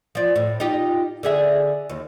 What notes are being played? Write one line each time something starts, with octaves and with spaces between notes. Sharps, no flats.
F3 D5
A2
D#4 F4 G4
D3 G#4 E5
D#2